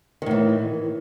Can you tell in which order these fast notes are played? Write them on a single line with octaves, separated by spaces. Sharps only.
D#3 A2 E3